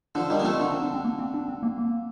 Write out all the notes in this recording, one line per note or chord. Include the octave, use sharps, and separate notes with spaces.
D3 F3 D4
D#3 G3 D4
A#3
F3 A3 C4
D3 D4
C4
D4
C4
A#3
C4
D4
C4
A#3
A#3